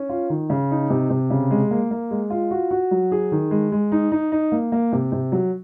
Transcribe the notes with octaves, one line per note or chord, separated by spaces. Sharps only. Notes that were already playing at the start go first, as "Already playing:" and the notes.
Already playing: C#4
F4
D#3
C#3
D#4
C3
C3
C#3
G#3
A#3
A#3
G#3
F4
F#4
F#4
F#3
G#4
D#3
G#3
G#3
D#4
D#4
D#4
A#3
A#3
C3
C3
F#3